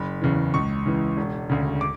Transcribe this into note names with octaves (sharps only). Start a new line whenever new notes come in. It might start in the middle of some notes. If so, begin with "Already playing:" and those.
Already playing: F#1 B5
E2 C#3 E3
C#2 C#6
C#3 E3
E1
D2 C#3
D6